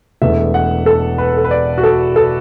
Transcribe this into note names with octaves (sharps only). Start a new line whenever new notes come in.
E1 E2 E3 A3 E5
F#5
A4
B4
A4
B4
D5
F#4
A4
A4